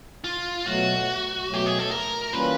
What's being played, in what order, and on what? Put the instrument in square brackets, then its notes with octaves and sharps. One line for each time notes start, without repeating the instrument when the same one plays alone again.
[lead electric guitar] F4
[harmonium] B2 F#3 A3 [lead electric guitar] F#4
[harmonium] B2 F#3 A3 [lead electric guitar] G4
[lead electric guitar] G#4
A4
A#4
[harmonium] E3 G3 A#3 C#4 F4 [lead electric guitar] B4